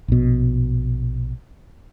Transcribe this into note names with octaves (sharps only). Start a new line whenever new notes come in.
A#1 B2